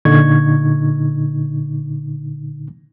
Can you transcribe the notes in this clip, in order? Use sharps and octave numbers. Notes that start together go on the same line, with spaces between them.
A#2 D3 D#4 C#6 G#6